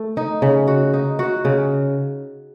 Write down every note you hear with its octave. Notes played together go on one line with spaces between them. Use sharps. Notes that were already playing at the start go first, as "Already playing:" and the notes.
Already playing: A3
D#4
C#3
F#4
D#4
F#4
C#3